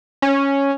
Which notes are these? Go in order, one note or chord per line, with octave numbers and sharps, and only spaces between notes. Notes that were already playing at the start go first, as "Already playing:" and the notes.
C#4